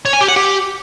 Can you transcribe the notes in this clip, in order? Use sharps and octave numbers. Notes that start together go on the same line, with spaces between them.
C#5
G#5
G4
F#5
G4